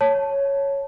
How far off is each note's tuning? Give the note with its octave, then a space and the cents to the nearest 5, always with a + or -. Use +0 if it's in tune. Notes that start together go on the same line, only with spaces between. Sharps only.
C#5 +0 A5 +0